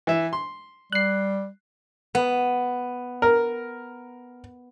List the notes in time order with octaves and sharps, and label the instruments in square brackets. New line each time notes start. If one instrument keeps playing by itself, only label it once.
[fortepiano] E3 E5
C6
[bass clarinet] G3 [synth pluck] F#6 C7
[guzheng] B3
[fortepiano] A#4